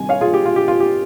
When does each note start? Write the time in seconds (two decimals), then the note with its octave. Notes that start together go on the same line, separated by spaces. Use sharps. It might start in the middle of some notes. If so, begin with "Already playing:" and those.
Already playing: C3 D#3 G3 G#5
0.09 C#5 F5
0.21 F4 G#4
0.34 G4
0.46 F4
0.56 G4
0.68 F4
0.80 G4